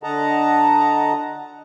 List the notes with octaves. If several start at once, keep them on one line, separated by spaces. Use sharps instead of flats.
D3 D#5 F#5 A5 A#5